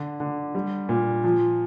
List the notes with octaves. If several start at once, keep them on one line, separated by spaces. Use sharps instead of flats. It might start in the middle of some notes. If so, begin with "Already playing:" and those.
Already playing: D3
D3
G3
A#2
F3